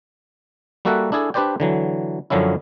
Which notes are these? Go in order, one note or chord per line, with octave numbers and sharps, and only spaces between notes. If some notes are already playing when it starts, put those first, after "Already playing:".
G3 A#3 F#4 A4 E5 F#5
D4 E4 G#4 A4
D4 G4 B4 C5 D5 G5
D3 E3 F#3
F#2 D3 F3 F#3 C#4 E4